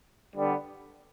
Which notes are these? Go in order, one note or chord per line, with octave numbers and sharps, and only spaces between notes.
D3 G3 B3